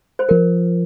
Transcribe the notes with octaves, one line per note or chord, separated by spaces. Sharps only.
C5
F3 A#4